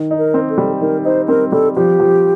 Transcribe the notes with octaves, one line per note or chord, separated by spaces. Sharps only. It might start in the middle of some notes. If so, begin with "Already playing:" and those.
Already playing: D#3
D#4
A#4
C4
A4
G3
D#3 A#4
D#4 C5
C4 A#4
G3 A4
F3 G4
F3